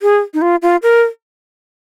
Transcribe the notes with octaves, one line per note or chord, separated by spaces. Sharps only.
G#4
D#4
F4
F4
A#4